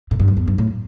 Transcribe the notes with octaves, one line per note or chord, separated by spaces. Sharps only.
A2
G2
F#2
E2
G2
A2